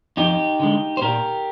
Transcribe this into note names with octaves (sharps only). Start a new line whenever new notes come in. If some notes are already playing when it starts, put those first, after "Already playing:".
F2 D#4 G4
D3 G#3
C5
A#2 G4 A#4